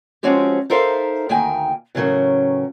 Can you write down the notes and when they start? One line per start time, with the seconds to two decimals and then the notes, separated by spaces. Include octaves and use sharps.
0.23 F3 G#3 C4 C#4 F#4 G4
0.70 D#4 A4 A#4 C5 E5 F5
1.29 D2 D#3 A#3 G5 G#5
1.95 A2 C#3 E3 F#3 C#4 A#4